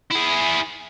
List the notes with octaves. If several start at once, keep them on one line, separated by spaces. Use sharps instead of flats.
E4 G#4